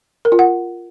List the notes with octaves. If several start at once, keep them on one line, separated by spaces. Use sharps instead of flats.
A#4
F4
F#5